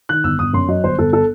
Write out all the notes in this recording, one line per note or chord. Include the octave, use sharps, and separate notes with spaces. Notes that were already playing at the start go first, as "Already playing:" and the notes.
D#3 F#6
G1 E6
G1 D#6
F#2 C6
F#3 D#5
G1 C5
G1 A4
A4